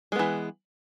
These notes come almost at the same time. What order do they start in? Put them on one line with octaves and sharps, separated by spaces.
G#3 B3 E3